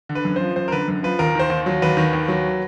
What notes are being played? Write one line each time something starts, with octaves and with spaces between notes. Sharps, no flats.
D3
B4
F#2
F3 C5
F#2 C5
A#4
D3 B4
F#2
F3 B4
D#2 A#4
D#3 C5
D#2
F#3
D#2 B4
D#3
D#2
F#3